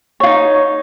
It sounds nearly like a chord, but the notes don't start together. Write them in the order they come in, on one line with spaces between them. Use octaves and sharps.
C#5 F4 D#4